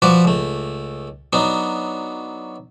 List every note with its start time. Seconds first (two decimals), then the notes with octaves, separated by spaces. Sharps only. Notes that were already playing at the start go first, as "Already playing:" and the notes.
0.02 F3 F#4 B4 D5 C#6 D6
0.25 C#2 A3
1.33 F#3 B3 D4 D#4